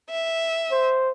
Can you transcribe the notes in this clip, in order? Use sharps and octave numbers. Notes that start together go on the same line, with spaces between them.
E5
C5